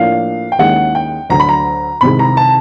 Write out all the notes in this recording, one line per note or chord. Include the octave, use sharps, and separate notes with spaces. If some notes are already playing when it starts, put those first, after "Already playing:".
Already playing: A2 F3 A#3 D4 F5
G5
D#2 D#3 G#3 C#4 E4 F#5
G5
D2 D3 F#3 A#5
B5
A#5
C2 C3 D#3 G#3 B5
A#5
A5